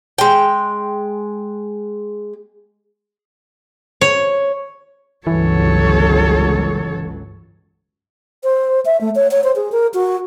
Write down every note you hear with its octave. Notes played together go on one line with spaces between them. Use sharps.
G#3 G5
C#5
G1 C#2 E3 F#3 A4 C#5
C5
E5
A3
C#5
C#5
C5
G#4
A#4
F#4